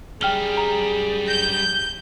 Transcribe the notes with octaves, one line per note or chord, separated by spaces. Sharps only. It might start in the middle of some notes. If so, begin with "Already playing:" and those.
F#2 G3 G#4 G5 F6 G7
A#5
G6 A#6